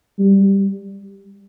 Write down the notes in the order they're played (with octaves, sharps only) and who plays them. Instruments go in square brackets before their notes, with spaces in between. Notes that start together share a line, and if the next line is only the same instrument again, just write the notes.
[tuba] G3